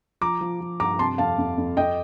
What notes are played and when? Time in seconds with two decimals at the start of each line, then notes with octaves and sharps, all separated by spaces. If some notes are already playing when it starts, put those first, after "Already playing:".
0.21 F3 A#5 D6
0.41 F3
0.61 F3
0.80 G2 A#5 D6
0.99 C3 A5 C6
1.18 F2 F5 A5
1.38 F2
1.58 F2
1.77 F2 D#5 G5